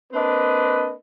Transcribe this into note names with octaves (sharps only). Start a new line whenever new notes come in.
A#3 C4 D4 B4 D#5